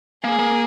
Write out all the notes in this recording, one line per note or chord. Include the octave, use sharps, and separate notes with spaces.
A#3 G#4
A#3